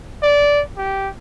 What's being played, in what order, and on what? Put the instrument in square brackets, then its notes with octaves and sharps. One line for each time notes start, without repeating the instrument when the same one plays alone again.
[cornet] D5
G4